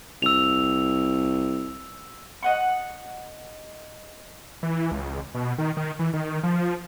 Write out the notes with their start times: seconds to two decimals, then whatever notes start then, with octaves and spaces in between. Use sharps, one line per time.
0.22 C2 E6 F7
2.43 D#5 F#5 C#6
4.63 E3
4.92 C#2
5.35 B2
5.58 D#3
5.77 D#3
5.99 E3
6.13 D#3
6.43 F3